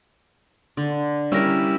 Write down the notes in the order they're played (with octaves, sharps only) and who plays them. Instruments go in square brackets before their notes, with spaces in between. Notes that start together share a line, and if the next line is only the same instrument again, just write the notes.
[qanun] D3
[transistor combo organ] G3 E4 [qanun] C#4 A#4